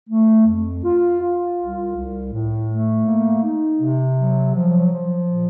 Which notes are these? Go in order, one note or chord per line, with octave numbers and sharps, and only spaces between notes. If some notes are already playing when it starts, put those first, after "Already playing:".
A3
F2
F4
F4
C2
C2
A2
A3
A#3
D#4
C3
F#3
F3
F3
A#2